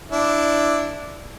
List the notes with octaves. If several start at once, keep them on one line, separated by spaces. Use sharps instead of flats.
D4 E4